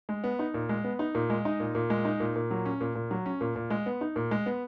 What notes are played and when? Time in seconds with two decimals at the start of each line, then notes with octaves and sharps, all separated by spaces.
0.09 G#3
0.24 B3
0.39 D#4
0.54 A#2
0.69 G#3
0.84 B3
0.99 D#4
1.15 A#2
1.30 G#3
1.45 D#4
1.60 A#2
1.75 A#2
1.90 G#3
2.05 D#4
2.20 A#2
2.36 A#2
2.51 F#3
2.65 C#4
2.81 A#2
2.95 A#2
3.11 F#3
3.26 C#4
3.41 A#2
3.56 A#2
3.70 G#3
3.86 B3
4.01 D#4
4.16 A#2
4.31 G#3
4.46 B3